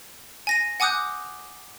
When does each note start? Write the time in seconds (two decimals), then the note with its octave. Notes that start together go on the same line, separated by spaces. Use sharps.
0.47 G#5 A#6 D#7
0.80 F#5 G#5 D6 D#6 F#6 G6